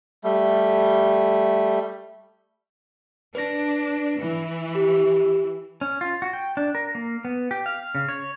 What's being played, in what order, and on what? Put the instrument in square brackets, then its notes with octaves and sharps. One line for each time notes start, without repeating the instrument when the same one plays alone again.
[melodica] G3 A3
[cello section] D4 [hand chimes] B4 A#6
[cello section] E3
[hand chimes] G4
[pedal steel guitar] C#4
F4
F#4
G5
D4
A#4
A#3
B3
G4
F5
C#3
C#5